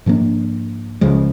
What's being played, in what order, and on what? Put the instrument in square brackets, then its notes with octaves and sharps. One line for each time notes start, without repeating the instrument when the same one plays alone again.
[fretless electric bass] G#2 F3 A#3 D4
C#2 C#3 F3 G#3